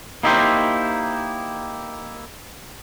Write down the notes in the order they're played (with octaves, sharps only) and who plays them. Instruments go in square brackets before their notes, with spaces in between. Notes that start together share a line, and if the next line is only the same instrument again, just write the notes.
[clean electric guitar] A#3 D#4 E4 G4 C5